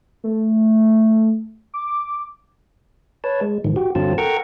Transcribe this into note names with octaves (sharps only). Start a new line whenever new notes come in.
A3
D6
B4 C#5 A5
G#3
G#2 D#3 F3
F#4 G4
G2 D3 F#3 C4 F4 A5
A4 A#4 F#5 G5 A#5 C#6